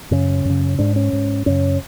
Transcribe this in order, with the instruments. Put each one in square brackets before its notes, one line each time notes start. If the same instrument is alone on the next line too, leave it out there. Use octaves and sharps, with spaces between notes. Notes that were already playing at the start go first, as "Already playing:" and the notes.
[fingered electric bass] F#2 C#3 C#4
F#2 C#3
G#2 D4
C#4
G#2
F#2 C#3 C#4